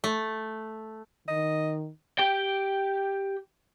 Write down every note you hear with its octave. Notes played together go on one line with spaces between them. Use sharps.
A3
D#3 D#5
G4 G5